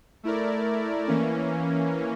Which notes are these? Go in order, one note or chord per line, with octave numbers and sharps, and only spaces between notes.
A3 E4 A#4 D5
E3 A#3 C#4